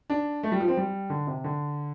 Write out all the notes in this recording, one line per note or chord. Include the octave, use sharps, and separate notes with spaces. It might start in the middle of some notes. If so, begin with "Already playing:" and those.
D4
A3
G3
F3
C4
G3
D3
C3
D3